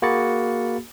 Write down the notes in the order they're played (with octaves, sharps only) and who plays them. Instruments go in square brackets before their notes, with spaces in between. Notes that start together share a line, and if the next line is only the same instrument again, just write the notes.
[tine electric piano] A#3 F#4 G#4 B5 A6 C#7